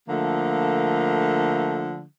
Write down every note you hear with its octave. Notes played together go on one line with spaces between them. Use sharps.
D3 F3 A3 A#3